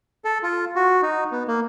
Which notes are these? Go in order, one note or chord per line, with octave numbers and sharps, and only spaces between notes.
A4
F4
F#4
D#4
B3
A#3